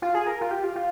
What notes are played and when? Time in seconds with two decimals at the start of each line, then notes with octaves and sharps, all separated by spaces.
0.02 F4
0.14 G#4
0.27 A#4
0.41 F4
0.51 G4
0.64 F4
0.76 F4